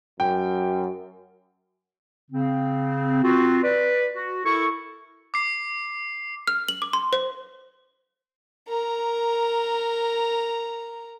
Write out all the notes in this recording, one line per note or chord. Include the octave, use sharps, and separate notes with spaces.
F#2 G5
C#3 C4
C4 F4 F#4
B4 D5
F#4
E4 A4 A#4 C#6
D6 C7
F6
F#7
D6
C6
C5
A#4 A#5